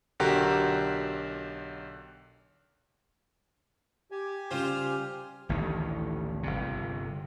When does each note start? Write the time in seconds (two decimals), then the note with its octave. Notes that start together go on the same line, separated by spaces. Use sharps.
0.20 B1 D3 F#4 G4 A#4
4.11 G4 G#5
4.51 C#3 G3 F4 C5
5.49 A1 D2 A2 D#3
6.43 G1 C3